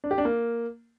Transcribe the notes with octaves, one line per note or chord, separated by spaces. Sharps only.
D4
G4
D4
A#3